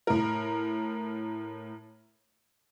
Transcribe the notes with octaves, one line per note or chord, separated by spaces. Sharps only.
A2 A#4